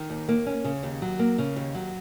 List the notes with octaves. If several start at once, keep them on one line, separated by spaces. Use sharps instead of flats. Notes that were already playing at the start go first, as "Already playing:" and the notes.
Already playing: D#3
D#2
A#3
C#4
C#3
D#2
F#3
A#3
C#3
D#2
F#3